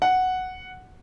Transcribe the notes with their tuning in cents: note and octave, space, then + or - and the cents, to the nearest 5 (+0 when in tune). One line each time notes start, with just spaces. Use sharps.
F#5 +0